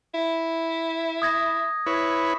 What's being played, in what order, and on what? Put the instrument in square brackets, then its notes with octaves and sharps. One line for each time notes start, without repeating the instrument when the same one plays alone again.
[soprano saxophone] E4
[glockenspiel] D#6 G#6 A#6
[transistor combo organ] E4 B4 C#5